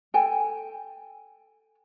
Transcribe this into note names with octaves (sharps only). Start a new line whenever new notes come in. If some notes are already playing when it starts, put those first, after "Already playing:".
A4 G5 G#5